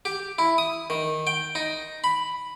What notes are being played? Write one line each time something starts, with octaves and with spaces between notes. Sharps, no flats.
G4
E4
D#6
D#3
G5
D#4
B5